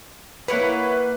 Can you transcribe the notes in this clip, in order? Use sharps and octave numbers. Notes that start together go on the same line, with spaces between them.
A#3 E4 B4 C#5 F#5